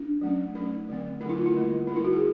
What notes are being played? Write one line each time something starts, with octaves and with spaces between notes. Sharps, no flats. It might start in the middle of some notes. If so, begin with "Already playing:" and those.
Already playing: D4
F#3 A3 C#4
F#3 A3 C#4 D#4
D3 F#3 A3 C4
D3 F#3 A3 C4 D#4
E4
F4
E4
D3 G3 A#3
D3 G3 A#3 D#4
E4
F#4
G#4